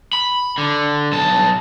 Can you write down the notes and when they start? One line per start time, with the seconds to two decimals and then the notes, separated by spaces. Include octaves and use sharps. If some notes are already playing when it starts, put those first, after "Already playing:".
0.13 B5
0.58 D3
1.12 B1 A5